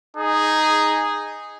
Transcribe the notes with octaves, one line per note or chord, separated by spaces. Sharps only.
D#4 G#4